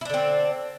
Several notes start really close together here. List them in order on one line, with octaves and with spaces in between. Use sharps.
E4 D4 D3 C4